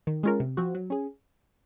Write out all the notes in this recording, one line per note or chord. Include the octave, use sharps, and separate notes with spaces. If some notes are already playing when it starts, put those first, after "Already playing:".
D#3
G#3 C#4 F4 A#4
C3
F3 C4 F#4
F#3
C#4 G#4